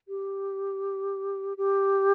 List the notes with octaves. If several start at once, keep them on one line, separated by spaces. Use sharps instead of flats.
G4
G4